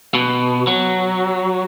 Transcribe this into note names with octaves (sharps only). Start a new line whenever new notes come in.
B2
F#3